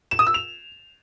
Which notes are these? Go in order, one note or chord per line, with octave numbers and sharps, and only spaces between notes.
E7
D#6
E6
F7